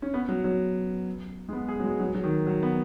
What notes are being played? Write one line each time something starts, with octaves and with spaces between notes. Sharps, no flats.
C#4
B3
F#3
F#3
G#3
B3
G#4
F#3
G#3
F#3
F#3
D#3
F#3
B3